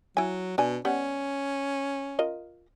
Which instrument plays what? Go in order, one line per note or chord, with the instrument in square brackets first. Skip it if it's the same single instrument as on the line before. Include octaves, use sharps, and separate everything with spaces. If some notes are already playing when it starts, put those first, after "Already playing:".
[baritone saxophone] F#3 [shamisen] E4 G#5
[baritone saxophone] B2 [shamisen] D4 G#5
[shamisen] G3 B3 F#5 [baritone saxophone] C#4
[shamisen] F4 A#4 D#5